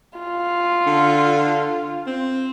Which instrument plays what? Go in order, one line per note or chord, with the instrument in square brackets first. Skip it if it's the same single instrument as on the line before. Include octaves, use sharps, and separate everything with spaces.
[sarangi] F4
[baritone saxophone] D3
C4